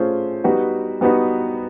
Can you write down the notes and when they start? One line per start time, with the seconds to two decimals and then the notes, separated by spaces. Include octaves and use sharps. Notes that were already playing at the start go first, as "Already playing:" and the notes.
Already playing: A3 C#4 F4 G#4 C5
0.44 G3 B3 D#4 F#4 B4
1.01 G3 B3 D#4 F#4 B4